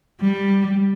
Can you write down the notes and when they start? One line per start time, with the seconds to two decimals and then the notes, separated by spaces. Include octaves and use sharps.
0.21 G3